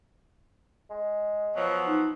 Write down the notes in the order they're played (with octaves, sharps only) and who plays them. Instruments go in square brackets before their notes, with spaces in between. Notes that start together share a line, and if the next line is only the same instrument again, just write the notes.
[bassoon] G#3
[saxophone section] B2 F3 F#3 [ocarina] C#5
[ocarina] D#4